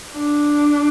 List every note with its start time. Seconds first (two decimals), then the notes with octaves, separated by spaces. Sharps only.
0.14 D4